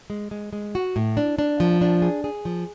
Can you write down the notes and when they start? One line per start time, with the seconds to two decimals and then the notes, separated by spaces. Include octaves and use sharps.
0.10 G#3
0.31 G#3
0.53 G#3
0.75 F#4
0.96 A2
1.17 D4
1.39 D4
1.60 F3
1.81 D4
2.02 G#4
2.24 G#4
2.45 F3